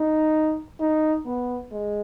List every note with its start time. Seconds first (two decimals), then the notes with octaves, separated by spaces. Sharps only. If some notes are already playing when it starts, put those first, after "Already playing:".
Already playing: D#4
0.80 D#4
1.26 B3
1.72 G#3